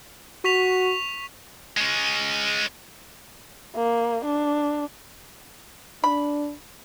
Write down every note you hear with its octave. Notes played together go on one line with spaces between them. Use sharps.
F#4 C#6 B6 F7
G#3 C#4
A#3
D4
D4 B5